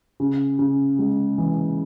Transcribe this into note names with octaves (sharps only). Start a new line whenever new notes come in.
C#3
C#3
G#3
E3